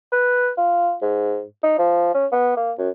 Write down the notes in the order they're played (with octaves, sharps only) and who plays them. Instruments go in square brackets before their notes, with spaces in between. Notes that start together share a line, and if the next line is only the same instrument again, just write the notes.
[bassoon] B4
F4
G#2
D#4
F3
C#4
B3
A#3
F#2